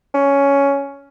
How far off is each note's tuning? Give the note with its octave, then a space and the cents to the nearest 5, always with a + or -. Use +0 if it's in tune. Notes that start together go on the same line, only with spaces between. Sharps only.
C#4 +10